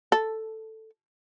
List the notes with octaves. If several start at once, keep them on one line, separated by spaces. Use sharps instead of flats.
A4